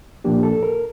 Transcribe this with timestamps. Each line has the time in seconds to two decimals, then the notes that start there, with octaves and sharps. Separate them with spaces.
0.24 A#2 F3 A#3 D4 G4
0.43 A4
0.63 A#4